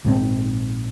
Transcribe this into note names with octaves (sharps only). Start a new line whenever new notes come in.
A#1 G#2 C#3 C4